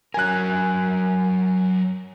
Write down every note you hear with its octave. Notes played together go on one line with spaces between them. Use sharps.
F#3 A#4 G#5 F#6